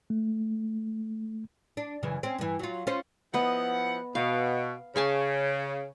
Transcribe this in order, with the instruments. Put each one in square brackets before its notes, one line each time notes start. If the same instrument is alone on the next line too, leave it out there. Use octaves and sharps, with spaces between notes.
[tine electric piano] A3
[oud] D4
F#2 C#3 E3
C4 C#4
G2 E3
F#3 F4
C#4 F4 C5
[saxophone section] F3 E4 F#5 [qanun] B3 D#5
[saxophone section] B2 [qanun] F5
[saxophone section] C#3 [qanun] C#5 G#5 A5